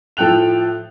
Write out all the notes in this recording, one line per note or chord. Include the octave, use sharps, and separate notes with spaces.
A2 F3 A4 G5 F#6 F7